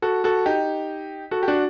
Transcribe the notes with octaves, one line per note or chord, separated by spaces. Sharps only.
F#4 A4
F#4 A4
D#4 G4
F#4 A4
G4
D4 F#4